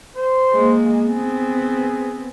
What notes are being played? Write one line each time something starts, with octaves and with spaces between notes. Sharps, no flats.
C5
G#3 A#3
B3 C4 G#4